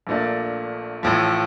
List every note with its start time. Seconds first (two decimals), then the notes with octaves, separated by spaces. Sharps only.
0.07 A#1 A#2 A3 D4
1.03 A1 A2 F3